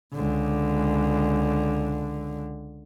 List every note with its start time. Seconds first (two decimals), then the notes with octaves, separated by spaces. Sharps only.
0.15 C#2 D3